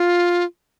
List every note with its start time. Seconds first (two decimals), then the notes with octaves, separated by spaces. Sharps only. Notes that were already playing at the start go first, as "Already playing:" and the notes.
Already playing: F4